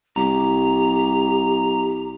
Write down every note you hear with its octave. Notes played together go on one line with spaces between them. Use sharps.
C2 G4 A#5